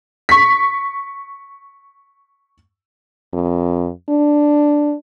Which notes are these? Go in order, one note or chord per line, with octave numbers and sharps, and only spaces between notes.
C#6 B6
F2
D4